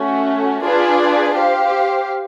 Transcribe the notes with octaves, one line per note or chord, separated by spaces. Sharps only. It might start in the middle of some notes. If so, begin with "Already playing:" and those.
Already playing: A3 C#4 F#4
D4 F4 G#4 B4 D5
G4 C5 F5